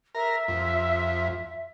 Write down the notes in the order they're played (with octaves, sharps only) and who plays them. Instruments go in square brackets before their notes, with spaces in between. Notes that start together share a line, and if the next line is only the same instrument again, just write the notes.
[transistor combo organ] A#4 [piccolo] E5
[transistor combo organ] F2